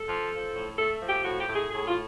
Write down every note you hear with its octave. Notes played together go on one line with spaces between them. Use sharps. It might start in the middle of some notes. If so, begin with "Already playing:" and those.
Already playing: A4
F3
F3
A2
A3 A4
F3
G4
A2 F#4
G4
A2
G#4
A2 G#4
F4